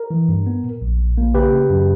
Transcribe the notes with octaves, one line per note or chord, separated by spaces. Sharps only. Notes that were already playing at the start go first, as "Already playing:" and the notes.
Already playing: A#4
E3
G2
B3
A#2
A#1
A#1
A#3
C#3 G4 B4
C#3
F#2